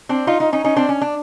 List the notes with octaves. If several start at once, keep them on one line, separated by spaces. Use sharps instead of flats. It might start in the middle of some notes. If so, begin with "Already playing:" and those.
C4 D4
D#4 F4
D#4 F4
C#4 D#4
C#4 D#4
C4 D4
C#4
D4